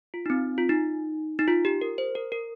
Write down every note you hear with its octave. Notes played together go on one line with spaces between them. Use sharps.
F4
D#4
C4
F4
D#4
D#4
F4
G4
A#4
C5
A#4
A#4